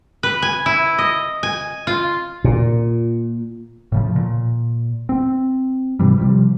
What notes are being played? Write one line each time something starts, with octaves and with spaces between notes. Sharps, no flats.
B4
G#5
E4
D#5
G#5
F4
A#2
A2 C#3 F3
A#2
C4
G#2 C3 E3 G3
C3 F3 G3